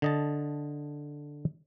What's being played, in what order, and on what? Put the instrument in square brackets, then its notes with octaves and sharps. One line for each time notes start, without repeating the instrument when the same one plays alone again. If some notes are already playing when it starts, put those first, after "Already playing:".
[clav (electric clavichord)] D3 D#5 A5